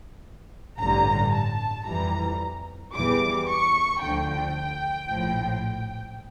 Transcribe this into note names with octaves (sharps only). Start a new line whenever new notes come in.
A1 G2 D3 G3 A#5
A5
F2 E3 G3 A#5
E2 E3 G3 D6
C#6
D2 D3 F3 G5
A#1 A2 F3